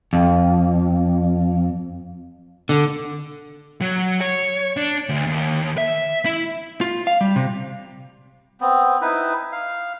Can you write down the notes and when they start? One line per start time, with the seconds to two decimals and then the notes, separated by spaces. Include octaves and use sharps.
0.13 F2
2.69 D3
3.81 F#3
4.21 C#5
4.77 D4
5.09 D2
5.26 D#2
5.78 E5
6.25 E4
6.81 F4
7.07 F5
7.21 G3
7.36 C3
8.61 B3 C4
9.02 D#4 E4 B4
9.52 F5